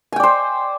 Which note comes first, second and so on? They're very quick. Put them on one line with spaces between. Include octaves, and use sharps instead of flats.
G#5 G5 D5 C5